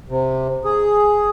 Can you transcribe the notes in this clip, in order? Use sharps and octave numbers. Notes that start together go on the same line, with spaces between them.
C3
G#4